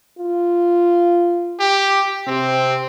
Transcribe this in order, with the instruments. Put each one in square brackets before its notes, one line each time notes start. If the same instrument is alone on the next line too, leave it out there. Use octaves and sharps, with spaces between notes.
[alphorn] F4
[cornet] G4
[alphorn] C3 [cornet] C4